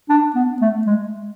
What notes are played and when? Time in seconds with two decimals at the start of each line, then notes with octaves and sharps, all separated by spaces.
0.09 D4
0.35 B3
0.61 A3
0.87 G#3